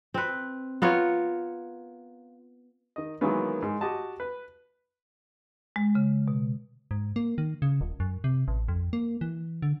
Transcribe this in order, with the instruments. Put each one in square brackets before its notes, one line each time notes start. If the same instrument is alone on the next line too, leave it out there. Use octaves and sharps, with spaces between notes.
[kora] C4 B4
B3 F4 A#4 C#5
[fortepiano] D#3 D#5
D#3 E3 F#3 G#3 A#3 B3
G#2
F#4 G4 D#5 A5
B4
[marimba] G#3
C#3
B2
[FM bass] G#2
A#3
D#3
C#3
D#1
F#2
C3
A1
F2
A#3
E3
D3